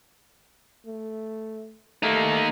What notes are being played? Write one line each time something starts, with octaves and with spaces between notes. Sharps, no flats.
A3
A3 A#3 D#4